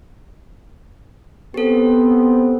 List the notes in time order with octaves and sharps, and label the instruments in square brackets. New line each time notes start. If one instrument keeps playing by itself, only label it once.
[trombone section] B3 C4 [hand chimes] G4 A4